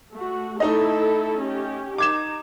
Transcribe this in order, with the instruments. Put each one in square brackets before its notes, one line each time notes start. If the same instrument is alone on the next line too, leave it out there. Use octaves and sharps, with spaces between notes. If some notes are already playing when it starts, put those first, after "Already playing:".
[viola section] A3 F#4
[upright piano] A3 D#4 D#5 [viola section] E4 A4
[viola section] C#4 G4
[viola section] D#4 [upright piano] D6 G#6 E7